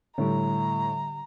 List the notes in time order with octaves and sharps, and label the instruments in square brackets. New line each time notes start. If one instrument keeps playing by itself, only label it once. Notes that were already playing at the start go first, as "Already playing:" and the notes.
[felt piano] A2 [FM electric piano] D3 G3 [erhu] A#5